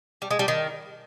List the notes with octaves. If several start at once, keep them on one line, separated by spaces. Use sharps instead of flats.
G3
G#3
G3
D#3